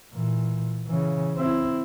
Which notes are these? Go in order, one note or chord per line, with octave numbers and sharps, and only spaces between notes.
A#2 E3
C#3 E3
C4 E4